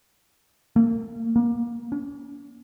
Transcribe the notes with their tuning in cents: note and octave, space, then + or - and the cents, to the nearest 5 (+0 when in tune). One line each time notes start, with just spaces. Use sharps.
A#3 -30
A#3 +25
C#4 +45